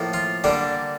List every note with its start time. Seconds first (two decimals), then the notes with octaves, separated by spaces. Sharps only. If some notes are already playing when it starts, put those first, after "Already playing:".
Already playing: A2 F3 A#3
0.14 F4
0.44 D3 G3 A#3 D4